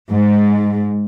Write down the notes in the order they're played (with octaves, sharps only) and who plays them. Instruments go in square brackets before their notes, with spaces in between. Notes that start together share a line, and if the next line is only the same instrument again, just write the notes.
[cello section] G#2